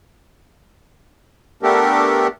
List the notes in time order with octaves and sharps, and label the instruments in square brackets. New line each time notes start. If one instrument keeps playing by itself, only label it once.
[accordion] A3 B3 D4 G4 A4 A#4